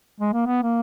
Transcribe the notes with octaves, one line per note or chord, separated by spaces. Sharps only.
G#3
A#3
B3
A#3